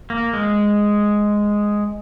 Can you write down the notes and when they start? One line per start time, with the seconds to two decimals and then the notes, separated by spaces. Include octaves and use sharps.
0.10 A#3
0.33 G#3